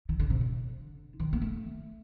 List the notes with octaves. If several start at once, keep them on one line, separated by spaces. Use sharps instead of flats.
D#3
D3
C3
D3
D#3
A#3
A3